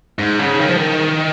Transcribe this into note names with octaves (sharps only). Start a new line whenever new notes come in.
G#2
C#3
D#3
F3
D#3